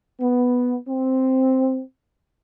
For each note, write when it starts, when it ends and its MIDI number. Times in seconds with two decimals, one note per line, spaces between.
0.20 0.76 59
0.87 1.80 60